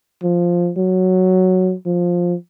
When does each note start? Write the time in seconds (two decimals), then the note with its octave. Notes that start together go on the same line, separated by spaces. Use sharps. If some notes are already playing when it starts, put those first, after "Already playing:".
0.23 F3
0.77 F#3
1.86 F3